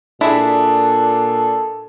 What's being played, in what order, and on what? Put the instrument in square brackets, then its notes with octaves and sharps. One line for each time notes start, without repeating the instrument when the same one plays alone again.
[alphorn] A#2 [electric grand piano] D4 G#4 [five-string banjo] E4 E5 [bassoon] A4